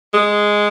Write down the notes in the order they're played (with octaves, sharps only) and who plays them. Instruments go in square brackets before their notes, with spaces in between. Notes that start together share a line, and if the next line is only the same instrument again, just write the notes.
[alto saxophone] G#3